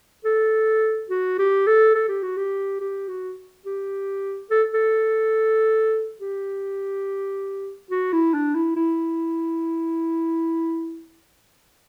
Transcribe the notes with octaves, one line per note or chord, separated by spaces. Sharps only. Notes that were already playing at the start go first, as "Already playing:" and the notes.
A4
F#4
G4
A4
A4
G4
F#4
G4
G4
F#4
G4
A4
A4
G4
F#4
E4
D4
E4
E4